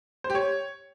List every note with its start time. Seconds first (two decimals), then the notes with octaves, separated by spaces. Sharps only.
0.24 C5
0.30 G4
0.35 C#5